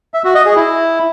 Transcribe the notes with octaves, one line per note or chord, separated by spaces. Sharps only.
E5
F#4
D#5
G#4
E4